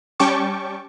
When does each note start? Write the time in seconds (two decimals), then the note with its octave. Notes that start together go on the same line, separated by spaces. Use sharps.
0.20 G3 C#4 G5 A5 C#6 D6